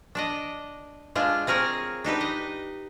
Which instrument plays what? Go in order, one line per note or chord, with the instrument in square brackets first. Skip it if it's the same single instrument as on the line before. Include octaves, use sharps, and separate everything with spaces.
[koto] D4 D5 D#5
G#3 D4 F4
C4 G#4 A#4 C#5 F5
D4 D#4 G4 B4
D#5